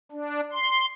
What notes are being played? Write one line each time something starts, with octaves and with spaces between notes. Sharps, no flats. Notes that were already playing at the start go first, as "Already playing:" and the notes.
D4
C6